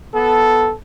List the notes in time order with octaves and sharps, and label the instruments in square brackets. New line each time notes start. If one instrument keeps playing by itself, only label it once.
[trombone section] B3 A4